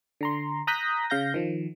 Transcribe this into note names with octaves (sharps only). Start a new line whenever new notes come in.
D3 A#5 C6
A#5 D#6 F#6 G6 A#6 B6
C#3 F5 G6 A#6
D#3 F3